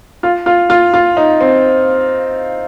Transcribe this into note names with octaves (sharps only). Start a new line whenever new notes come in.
F4
F4
F4
F4
D#4
C4